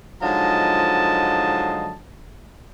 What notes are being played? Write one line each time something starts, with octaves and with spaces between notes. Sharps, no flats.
G#2 D3 F3 F#3 D#5 A5